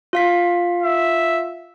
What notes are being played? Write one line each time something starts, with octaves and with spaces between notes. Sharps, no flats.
F4 F5 B6
E5